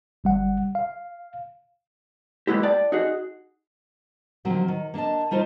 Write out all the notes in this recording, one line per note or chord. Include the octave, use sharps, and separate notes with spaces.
G1 G3 F#5
F5
G#3 A#3 B3 E4 G4
D5 G5 A5
D#4 F#4 G#4
D3 D#3 F3 F#3 A#3 C4
D#3
A#3 D4 A#4 D#5 A5
G3 D#4 F4 C5 D#5